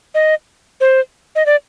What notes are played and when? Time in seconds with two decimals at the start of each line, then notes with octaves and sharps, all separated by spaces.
0.14 D#5
0.80 C5
1.35 D#5
1.46 D5